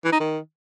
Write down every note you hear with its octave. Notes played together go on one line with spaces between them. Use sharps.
E3
D#4
D#3